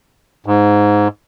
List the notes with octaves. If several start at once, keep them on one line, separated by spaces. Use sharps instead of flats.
G#2